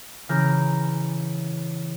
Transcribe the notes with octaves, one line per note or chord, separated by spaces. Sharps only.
C#3 E3 A#5 F6 G6